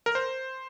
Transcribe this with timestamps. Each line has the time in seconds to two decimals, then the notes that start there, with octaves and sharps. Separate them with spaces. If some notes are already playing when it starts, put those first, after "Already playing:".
0.06 A#4
0.15 C5